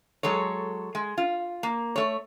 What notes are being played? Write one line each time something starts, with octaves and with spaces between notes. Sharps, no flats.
F#3 G#3 A4 C#5
G#3
F4
A#3
A3 C#5